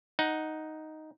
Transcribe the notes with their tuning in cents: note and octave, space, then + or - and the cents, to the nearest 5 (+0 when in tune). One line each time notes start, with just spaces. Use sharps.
D#4 +0 F#5 +5